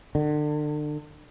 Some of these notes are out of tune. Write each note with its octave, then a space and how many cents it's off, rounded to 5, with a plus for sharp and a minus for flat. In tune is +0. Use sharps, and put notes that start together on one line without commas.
D3 +35